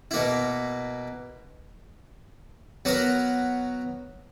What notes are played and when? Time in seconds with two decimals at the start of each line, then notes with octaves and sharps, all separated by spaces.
0.11 B2 A#3 E4
2.85 F#3 B3 F#4 A#4